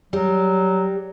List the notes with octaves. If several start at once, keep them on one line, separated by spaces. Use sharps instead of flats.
F#3 G3